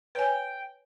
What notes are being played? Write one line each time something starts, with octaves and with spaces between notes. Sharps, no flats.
B4 C#5 G5 G#5